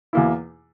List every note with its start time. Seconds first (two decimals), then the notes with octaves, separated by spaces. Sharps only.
0.13 E2 B2 A#3 E4